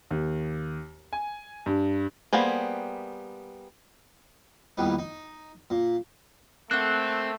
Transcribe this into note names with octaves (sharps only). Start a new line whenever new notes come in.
D#2
G#5
G2
G3 A#3 B3 G#4 C5
A#1 E2 D#3 G3 B4
D#4
A#2
A3 A#3 C4 A4 F#5 F#6